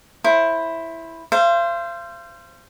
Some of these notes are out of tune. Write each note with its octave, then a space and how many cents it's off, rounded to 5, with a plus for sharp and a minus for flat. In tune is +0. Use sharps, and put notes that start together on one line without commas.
E4 +0 C5 +20
C5 +0 F5 -40